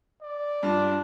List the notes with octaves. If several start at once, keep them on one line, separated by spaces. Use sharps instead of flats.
D5
G2 D4 F4